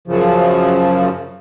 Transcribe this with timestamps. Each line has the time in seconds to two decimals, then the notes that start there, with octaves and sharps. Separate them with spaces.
0.07 F#2 C#3 F3